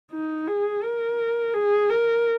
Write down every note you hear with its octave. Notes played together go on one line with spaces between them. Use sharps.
D#4
G#4
A#4
G#4
A#4